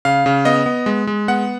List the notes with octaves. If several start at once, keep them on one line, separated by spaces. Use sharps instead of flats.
C#3 F5
C#3
B3 D#5
B3
G#3
G#3
B3 F#5